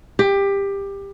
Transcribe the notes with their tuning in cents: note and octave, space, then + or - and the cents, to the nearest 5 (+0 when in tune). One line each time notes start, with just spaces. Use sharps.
G4 +20